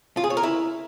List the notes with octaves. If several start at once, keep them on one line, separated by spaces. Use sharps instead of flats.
F4
G#4
C#5
A#4
E4